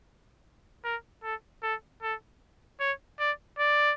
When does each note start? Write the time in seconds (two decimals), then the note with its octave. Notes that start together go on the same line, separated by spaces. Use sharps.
0.84 A#4
1.23 A4
1.63 A4
2.02 A4
2.80 C#5
3.19 D5
3.59 D5